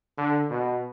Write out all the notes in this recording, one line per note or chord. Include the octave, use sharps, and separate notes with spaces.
D3
B2